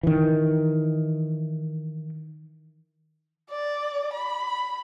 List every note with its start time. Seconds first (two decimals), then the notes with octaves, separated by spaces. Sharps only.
0.03 D#3 E3
3.50 D5
4.14 B5